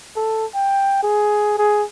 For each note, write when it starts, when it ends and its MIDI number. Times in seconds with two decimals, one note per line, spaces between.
0.16 0.45 69
0.54 1.03 79
1.03 1.57 68
1.58 1.84 68